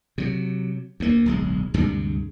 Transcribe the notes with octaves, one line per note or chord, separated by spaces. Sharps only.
C3 F#3
D2 A#3
D1 B1 G#3
D2 G2 C3 G#3